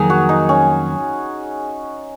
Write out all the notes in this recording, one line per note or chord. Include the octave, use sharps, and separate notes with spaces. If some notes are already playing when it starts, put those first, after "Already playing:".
Already playing: F2 D#3 F#3 A#3 G#4
F#4
D#4
C#4